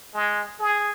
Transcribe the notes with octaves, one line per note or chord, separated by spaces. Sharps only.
G#3
G#4